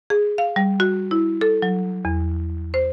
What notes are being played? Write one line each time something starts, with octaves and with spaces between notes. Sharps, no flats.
G#4
F5
G3
F#4
E4
A4
F#3
E2
C5